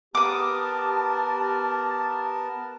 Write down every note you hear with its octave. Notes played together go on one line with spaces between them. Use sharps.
B3 G4 A#4 A5 D6 D#6